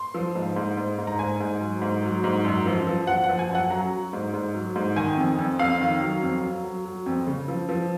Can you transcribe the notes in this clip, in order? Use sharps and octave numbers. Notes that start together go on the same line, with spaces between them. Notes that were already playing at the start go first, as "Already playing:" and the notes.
Already playing: C6
F3
G#2
G#2
G#2
G#2
A#5
G#2 G#5
G#2
F#3
G#2
F#3
G#2
F#2
F3
F3
F3 F#5
F#5
F3
G#5
F#2 F#5
F#3 A#5
F#3
G#2
G#2
F#3
G#2
D#3 G#5
F2
F2
F2 F5
D#3
F#3
F2
F#3
F#3
F#3
F2
C#3
F3
F3